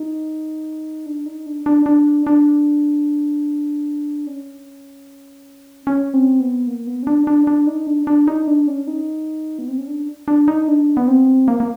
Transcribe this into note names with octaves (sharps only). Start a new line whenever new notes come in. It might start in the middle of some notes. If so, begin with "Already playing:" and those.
Already playing: D#4
D4
D#4
D4
D4
D4
D4
C#4
C#4
C4
B3
A#3
B3
C#4
D4
D4
D4
D#4
D4
D4
D#4
D4
C#4
D#4
B3
C4
C#4
D4
D4
D#4
D4
B3
C4
A#3
A#3